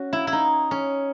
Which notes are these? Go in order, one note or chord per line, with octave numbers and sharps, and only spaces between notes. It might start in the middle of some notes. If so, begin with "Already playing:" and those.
Already playing: C#4 F#4
E4
E4
D#4
C#4